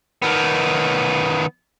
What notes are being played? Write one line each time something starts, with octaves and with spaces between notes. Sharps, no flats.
D#3 B3